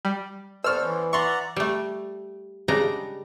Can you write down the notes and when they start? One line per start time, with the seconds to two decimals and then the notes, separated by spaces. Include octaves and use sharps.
0.05 G3
0.64 B3 A4 C5 D5 C#6 E6 F6
0.81 E3 B3 C#4
1.13 D5 E5 F#5 A#5 C6 C#6
1.56 G3 A3
2.68 C#3 G3 G#3 D4 A#5